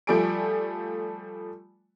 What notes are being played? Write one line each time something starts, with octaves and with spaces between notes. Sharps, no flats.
F3 G3 A3 D5 G#5 D7